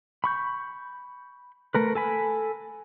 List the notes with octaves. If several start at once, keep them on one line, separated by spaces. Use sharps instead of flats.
B5 C#6 G6
A3 A#4 B4
A4 G#5 B5